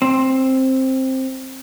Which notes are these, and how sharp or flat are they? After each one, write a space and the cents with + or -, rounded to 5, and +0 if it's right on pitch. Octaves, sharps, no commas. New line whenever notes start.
C4 +10